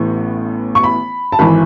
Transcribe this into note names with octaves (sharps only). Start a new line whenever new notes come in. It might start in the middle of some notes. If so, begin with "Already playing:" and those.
Already playing: A1 A2 E3 B3
C#6
B5
A5
G#1 E3 B5